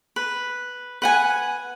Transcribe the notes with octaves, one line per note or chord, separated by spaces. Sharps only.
B4
B4 F#5 G#5